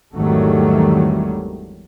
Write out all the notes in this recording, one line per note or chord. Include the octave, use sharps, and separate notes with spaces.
G#1 E2 D#3 F#3 G3 A3